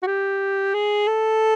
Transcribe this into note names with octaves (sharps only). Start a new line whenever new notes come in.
F#4
G4
G#4
A4